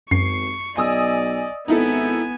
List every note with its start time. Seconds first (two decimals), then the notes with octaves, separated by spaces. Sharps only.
0.11 G#1 F#2 C#6 C7
0.77 B1 D5 D#5 G#5 D#6 E6
1.68 G#1 B3 D#4 E4 A4 G#5